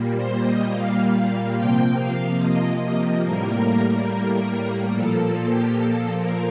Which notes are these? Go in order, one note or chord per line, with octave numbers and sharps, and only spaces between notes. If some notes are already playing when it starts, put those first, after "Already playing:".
Already playing: A#2 G3 A#3
C5
D#5
F5
C3 F3 A#3 G5
F5
D#5
A2 G3 A#3 A#4
A#2 F3 A#3 A4
A4
G4
A4
A#4